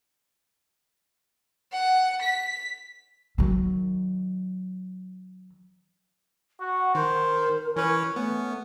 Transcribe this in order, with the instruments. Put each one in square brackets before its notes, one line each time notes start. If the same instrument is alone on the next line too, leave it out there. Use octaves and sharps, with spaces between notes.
[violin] F#5
B6
[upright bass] D#3 F#3
[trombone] F#4 [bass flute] F#5
[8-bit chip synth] D#3 [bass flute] A#4 [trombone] C5
[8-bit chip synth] E3 B4 [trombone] C#4
[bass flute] A3 [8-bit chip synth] B3 [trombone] C#4